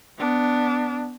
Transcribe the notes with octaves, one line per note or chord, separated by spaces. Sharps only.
B3 D4